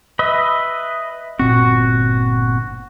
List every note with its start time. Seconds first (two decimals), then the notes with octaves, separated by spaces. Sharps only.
0.19 B4 D#5 E5
1.39 G1 A#2 C4 F#4